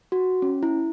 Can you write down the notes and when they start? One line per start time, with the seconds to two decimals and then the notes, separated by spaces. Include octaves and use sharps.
0.12 F#4
0.42 C#4
0.63 E4